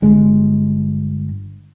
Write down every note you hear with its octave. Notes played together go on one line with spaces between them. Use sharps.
G1 G#3